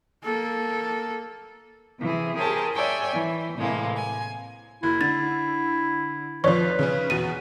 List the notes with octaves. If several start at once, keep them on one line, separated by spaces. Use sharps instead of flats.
A#3 A4
C3 E3 G#4
G4 G#4 A#4 C5 C#5 A5
C#5 D5 E5 G5 G#5
E3
A2 C3 E3 G#3 A#3
G#5
F#1 E4
D3 A6
F2 F3 B4 C#5 D5 C#6
C#3 C#4
E2 B2 D#7